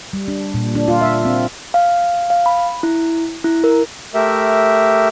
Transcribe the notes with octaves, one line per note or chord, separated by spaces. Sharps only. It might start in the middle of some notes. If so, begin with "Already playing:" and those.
G3
D4
A#2
D4
F4
E5
C4
F5
F5
B5
E4
E4
A#4
A3 G4 A#4 E5